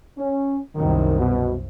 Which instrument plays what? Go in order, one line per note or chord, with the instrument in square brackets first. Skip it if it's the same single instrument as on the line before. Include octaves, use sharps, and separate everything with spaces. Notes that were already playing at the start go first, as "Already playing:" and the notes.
[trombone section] C#4
[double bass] C2 F#2 [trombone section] D#3
[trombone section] B2